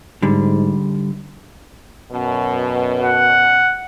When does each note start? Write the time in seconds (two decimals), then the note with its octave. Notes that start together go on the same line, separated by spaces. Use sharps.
0.22 G#2 D3 G3
2.12 F#2 B2
3.04 F#5